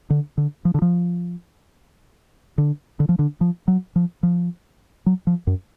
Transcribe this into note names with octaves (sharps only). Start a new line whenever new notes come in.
D3
D3
F3
D3
F3
D3
D3
F3
D3
F3
F#3
F3
F3
F#3
F3
F#2